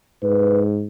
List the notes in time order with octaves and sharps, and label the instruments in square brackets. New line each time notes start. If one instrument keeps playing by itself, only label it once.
[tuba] G#2 [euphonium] B4